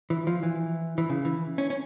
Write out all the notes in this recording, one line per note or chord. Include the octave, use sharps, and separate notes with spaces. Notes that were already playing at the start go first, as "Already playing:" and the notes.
E3
F3
E3
E3
C#3
E3
C#4
C#4